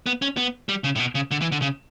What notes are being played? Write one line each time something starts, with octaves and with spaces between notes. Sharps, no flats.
B3
C#4
B3
G3
C#3
A2
B2
C#3
D3
E3
D3
C#3